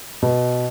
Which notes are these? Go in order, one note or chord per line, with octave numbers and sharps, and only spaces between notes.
B2